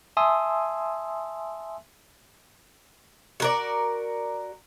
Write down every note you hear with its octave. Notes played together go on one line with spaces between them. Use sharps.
E5 G#5 A5 C6 D#6 E6
F#4 A#4 D5